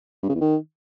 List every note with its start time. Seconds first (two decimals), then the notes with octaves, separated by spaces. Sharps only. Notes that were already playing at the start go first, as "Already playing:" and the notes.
0.23 G2
0.29 C#3
0.35 E2
0.41 D#3